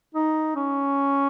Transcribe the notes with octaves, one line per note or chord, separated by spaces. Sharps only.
D#4
C#4